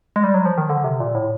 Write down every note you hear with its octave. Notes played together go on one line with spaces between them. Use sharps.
G#3
G3
F#3
F3
D#3
D3
C3
A#2
A2